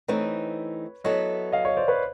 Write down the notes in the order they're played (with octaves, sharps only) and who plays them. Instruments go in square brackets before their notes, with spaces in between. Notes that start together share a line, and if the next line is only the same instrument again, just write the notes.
[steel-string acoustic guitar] E3 A3 C4 D#4 [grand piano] B4 C#5
[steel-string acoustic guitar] F#3 B3 E4 A4 [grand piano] C#5 D#5
[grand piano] D#5 F5
C#5 D#5
C5 D5
B4 C#5